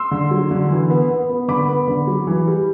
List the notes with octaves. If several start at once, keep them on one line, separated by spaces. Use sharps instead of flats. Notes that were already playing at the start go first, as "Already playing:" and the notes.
Already playing: C6 E6
D3
F#3
D3
E3
B3
B3
B3
D3 B5 D6
B3
D3
F#3
E3
G3